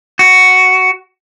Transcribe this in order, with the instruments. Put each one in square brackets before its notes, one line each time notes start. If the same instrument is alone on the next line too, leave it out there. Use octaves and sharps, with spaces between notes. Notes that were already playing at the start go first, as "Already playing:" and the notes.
[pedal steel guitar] F#4